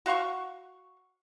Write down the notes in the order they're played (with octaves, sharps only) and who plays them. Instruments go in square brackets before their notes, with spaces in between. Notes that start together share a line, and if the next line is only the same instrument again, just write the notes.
[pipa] F#4 F5 C6 C#6